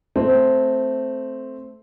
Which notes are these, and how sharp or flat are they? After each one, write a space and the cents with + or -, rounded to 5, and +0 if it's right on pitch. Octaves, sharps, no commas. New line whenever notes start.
A3 +0 C4 +0